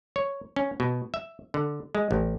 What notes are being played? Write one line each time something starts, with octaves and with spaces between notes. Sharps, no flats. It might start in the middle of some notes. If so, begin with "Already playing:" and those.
C#5
C#4
B2
E5
D3
G#3
A1